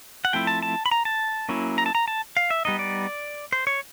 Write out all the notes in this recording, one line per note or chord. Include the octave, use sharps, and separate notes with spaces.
F#5
F3 A3 C4 E4 G5
A5
A5
B5
A#5
A5
F#3 A#3 C#4 E4
A#5
A5
A#5
A5
F5
E5
G3 B3 D#4 D#5
D5
C5
C#5